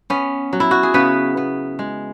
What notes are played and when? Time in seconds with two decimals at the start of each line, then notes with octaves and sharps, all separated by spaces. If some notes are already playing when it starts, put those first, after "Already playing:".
0.10 B3 C#4
0.53 F#3
0.60 E4
0.71 F#4
0.83 G#4
0.94 C#3 B3 B4
1.37 B3
1.79 G#3